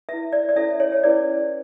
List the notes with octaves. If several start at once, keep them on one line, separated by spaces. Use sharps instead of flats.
E4 B4 E5
D5
D5
C#4 E4 A4 C#5 E5
C#5
C#5
C#4 E4 G#4 B4 D5